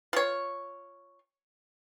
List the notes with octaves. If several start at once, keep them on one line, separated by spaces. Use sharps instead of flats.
F4 C#5